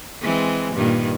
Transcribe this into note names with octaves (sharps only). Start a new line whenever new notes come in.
E3 G#3 C4
G2 A#2 D#3